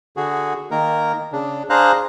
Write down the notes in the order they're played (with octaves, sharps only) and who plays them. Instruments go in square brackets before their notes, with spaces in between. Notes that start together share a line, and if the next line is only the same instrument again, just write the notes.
[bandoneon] D3 F#4 G#4
D#3 A#3 A#4
C#3 D4
D4 G#4 C5 F5 A#5 F#6